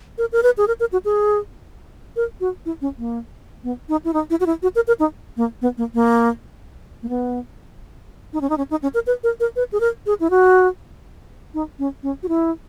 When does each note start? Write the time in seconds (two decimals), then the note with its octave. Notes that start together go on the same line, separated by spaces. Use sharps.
0.18 A#4
0.32 A#4
0.43 B4
0.57 G#4
0.68 A#4
0.80 A#4
0.93 F#4
1.05 G#4
2.16 A#4
2.40 F#4
2.66 E4
2.82 C#4
2.98 A#3
3.64 B3
3.89 D#4
4.05 E4
4.13 D#4
4.30 E4
4.40 F#4
4.46 E4
4.63 F#4
4.75 A#4
4.88 A#4
5.00 D#4
5.37 A#3
5.62 B3
5.78 A#3
5.94 A#3
7.03 A#3
7.09 B3
8.33 D#4
8.41 C#4
8.50 D#4
8.58 C#4
8.71 D#4
8.82 C#4
8.94 A#4
9.07 B4
9.24 A#4
9.40 A#4
9.56 B4
9.72 G#4
9.80 A#4
10.06 G#4
10.20 E4
10.30 F#4
11.54 D#4
11.79 C#4
12.03 C#4
12.23 F#4
12.29 E4